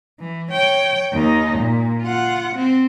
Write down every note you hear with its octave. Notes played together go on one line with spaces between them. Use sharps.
E3
C#5 G5
D#2 D#4
A#2
F4 F#5
C4